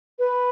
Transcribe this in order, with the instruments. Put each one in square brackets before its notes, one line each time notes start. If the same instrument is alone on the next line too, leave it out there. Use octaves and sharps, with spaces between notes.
[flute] B4